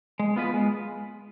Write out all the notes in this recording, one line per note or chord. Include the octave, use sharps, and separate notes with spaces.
G#3
B3 F4 B4
G#3